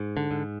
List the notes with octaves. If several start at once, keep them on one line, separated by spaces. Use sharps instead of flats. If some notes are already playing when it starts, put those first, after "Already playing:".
Already playing: G#2
D3
G#2